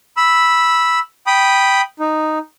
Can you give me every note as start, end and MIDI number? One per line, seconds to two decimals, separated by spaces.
0.17 0.99 83
0.17 0.99 88
1.27 1.81 79
1.27 1.81 83
1.27 1.81 87
2.00 2.38 63